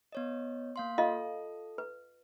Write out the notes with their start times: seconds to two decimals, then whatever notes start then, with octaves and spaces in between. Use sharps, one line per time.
0.12 B3 C#5 D#5
0.76 A#3 F5 C6
0.98 F4 A4 D#5 F5
1.78 B4